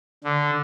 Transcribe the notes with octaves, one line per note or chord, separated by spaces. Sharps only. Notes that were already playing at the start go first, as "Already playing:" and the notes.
D3